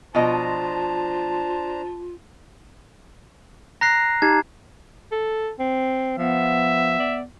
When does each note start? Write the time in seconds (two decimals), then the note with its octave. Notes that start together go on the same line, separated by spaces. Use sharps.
0.15 B2 F3 D4 F4 C5 D#5 A5 A#5
3.81 A#5 F#6 A#6 C7
4.22 D#4 G4 A5 G#6
5.12 A4
5.59 C4
6.18 F3 B3 E5
6.99 D5